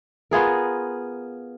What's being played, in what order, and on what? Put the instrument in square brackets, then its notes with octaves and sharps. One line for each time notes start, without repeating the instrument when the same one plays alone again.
[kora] B3 F4 G#4 A#4